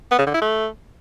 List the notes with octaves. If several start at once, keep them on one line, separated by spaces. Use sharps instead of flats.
B3
C#3
D3
E4
A3